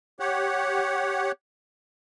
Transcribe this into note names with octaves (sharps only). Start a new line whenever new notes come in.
G4 C#5 F#5